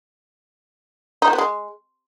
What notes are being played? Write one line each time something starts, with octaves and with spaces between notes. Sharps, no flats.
D#4
F3
B3
G#3